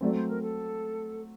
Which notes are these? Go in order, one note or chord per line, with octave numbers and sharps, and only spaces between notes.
F#3 A3 C4 D5
C5
A#4
A4